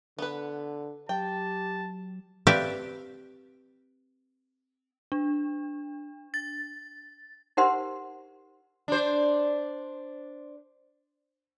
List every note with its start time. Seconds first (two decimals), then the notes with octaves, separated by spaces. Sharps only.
0.19 D3 B3 B4
1.09 F#3 G4 G5 A5
2.47 C4 G4 B4 D5 E5 F5
5.12 D4
6.34 A6
7.57 D#4 G4 A#4 C5 F#5 C6
8.88 D4 C5